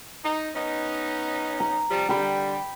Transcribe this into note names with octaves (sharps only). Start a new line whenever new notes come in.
D#4
B3 C#4 D#4
A#5
C3 F3 G3
D3 G3 G5 B5